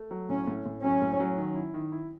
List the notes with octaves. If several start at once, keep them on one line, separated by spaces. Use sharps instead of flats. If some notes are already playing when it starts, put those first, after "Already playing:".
Already playing: A3
F#3
A2 C#4
A2
A2
F#3 C#4
A2
F#3
D#3
E4
D#3
E4